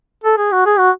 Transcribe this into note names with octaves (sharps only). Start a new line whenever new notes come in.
A4
G#4
F#4
G#4
F#4